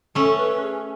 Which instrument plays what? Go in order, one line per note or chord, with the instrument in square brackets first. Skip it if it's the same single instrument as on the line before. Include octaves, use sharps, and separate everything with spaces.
[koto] A3 C#4 [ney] A4
[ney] B4
G#4